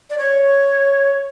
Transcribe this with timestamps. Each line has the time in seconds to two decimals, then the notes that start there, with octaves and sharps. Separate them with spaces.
0.10 D5
0.18 C#5